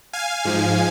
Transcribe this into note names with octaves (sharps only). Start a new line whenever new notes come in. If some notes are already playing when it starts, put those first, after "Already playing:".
F5 G#5
G#2 F3